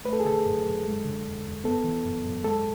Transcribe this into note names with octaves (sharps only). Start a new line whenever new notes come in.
A3 B4
A4
G#4
D3 A4
F#2
F#2
G#3
D3
E2
E2
B3 A4
E3
F#2
F#2
G#3 A4